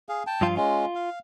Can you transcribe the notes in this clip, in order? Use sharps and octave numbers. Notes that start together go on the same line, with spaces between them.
G#4 F5
G5 A5
G2 F3 F4
G#3 C#4 F4
F5